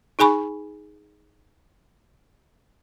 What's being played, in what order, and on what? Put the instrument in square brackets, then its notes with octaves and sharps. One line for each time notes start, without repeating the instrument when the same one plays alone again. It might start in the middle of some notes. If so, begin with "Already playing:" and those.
[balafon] D#4 G#4 G#5 B5 C#6